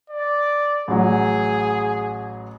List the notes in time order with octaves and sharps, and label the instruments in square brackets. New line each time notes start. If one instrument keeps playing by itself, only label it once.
[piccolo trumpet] D5
[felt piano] A1 F#3 [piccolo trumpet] G#4